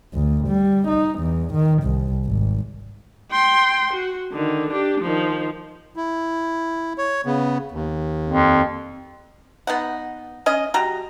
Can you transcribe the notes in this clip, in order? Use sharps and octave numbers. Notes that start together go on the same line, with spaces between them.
D2
G3
D#4
E2
D#3
C2
G#1
G5 C6
F#4
D3 D#3
D4 G4
D#3 F3
E4
C#5
C#3 B3
D#2
F2
B3 D#4 F#5
C#4 D#5
G3 F#4 A#5